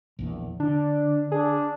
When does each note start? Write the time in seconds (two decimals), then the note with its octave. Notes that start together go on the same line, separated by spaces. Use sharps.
0.19 A#1 E2
0.60 D3 D4
1.32 D4 G#4